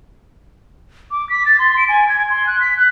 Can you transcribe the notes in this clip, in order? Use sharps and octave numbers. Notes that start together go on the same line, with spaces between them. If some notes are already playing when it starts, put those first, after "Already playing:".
D6
B6
A6
C6
D7
G#5
G#6
C6
F#6
B6
F#6